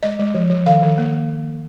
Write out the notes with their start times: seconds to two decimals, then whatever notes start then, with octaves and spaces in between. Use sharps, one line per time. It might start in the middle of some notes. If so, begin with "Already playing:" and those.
0.03 G#3 D#5
0.19 G#3
0.34 F3
0.50 F3
0.66 D#3 F5
0.82 D#3
0.98 A#3